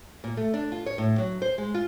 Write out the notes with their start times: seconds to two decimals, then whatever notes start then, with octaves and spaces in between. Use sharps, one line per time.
0.24 A#2
0.37 A3
0.54 D4
0.72 F4
0.86 C#5
0.98 A2
1.18 F#3
1.42 C5
1.58 G#3
1.74 F4